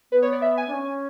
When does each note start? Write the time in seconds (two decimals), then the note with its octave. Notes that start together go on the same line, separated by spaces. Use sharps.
0.12 B3 B4
0.22 C#5
0.32 D5
0.42 E5
0.57 G#5
0.67 D4
0.73 C#4